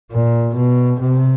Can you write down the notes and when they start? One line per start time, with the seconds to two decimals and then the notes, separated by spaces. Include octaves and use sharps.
0.12 A#2
0.55 B2
1.00 C3